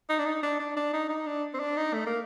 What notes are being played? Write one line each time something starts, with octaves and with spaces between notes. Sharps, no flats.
D#4
D4
D#4
D4
D4
D4
D#4
D#4
D4
C4
D4
D#4
A3
A#3